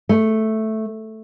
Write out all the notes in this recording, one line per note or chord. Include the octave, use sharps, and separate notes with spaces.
A3